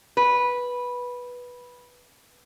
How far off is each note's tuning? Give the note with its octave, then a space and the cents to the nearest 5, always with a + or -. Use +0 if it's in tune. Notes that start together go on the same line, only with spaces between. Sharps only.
B4 -10